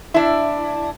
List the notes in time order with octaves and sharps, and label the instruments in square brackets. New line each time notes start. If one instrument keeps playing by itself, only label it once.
[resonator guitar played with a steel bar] D4 E4